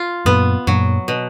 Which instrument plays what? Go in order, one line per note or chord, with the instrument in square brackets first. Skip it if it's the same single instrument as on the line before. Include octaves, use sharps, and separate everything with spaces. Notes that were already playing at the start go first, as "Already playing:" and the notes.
Already playing: [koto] F4
[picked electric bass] F#2 A#2 [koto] B3
[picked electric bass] F#2 A#2 [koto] F#3
[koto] B2